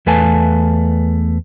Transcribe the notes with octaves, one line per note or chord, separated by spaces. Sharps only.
E2 A3 B4 F5 G#5 A5